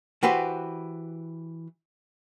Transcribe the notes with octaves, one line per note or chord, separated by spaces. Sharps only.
E3 F#4 G4 B4 C5